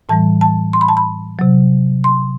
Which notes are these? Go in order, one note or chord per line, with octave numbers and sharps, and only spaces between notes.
A2 E3 G3 A5
A5
C6
B5
A5
B5
C3 F#3
C6